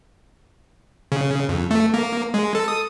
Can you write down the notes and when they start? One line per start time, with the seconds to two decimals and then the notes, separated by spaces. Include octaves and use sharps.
1.12 C#3
1.49 F2
1.71 A3
1.94 A#3
2.34 G#3
2.55 A4
2.68 D#6